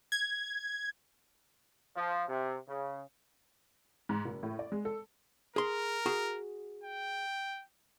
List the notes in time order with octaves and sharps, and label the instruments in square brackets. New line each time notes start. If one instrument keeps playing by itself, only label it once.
[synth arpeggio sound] G#6
[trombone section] F3
C3
C#3
[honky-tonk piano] G#2
F#1
A2
D5
G#3
A4
[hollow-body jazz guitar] G#4 C6 [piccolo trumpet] A#4
[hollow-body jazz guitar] F#4 G#4
[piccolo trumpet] G5